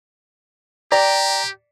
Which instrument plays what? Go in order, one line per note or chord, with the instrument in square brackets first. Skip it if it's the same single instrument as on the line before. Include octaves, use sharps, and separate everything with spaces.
[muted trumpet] G4 [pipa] D5 [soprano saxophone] G5 [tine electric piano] A#5